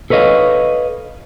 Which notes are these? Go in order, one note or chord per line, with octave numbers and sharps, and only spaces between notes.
A4 B4 C#5 D#5 F5